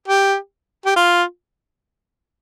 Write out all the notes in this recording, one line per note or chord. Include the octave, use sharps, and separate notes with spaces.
G4
G4
F4